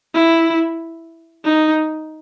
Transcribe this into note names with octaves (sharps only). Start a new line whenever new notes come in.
E4
D#4